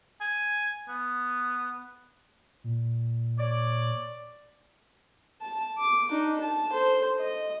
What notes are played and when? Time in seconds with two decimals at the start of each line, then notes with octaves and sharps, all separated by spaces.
0.21 G#5
0.88 B3
2.64 A#2
3.38 C#5 D5
5.42 A5
5.78 D6
6.10 D4 D#4
6.40 A5
6.72 A4 C5
7.18 D#5